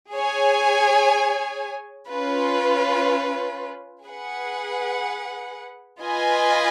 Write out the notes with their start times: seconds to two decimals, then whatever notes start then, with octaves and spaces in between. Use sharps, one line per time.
0.11 G#4 C#5 G#5
2.08 C#4 F4 B4
4.03 G#4 B4 F#5
6.00 F4 B4 D#5 G#5